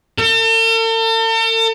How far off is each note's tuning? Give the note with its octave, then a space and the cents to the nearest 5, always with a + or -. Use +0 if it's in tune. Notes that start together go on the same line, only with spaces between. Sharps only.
A4 +45